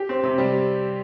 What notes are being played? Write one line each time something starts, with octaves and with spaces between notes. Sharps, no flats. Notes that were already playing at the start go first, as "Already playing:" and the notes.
Already playing: G4
C4
C3
G3